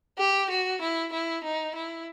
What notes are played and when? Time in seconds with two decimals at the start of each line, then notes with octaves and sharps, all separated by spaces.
0.19 G4
0.50 F#4
0.81 E4
1.12 E4
1.44 D#4
1.75 E4